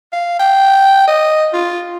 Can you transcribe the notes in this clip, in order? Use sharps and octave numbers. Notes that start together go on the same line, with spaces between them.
F5
G5
D#5
F4